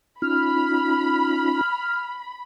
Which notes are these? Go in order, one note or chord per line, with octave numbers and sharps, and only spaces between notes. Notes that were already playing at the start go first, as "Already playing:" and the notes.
C#4 D#4 F4 B5 F6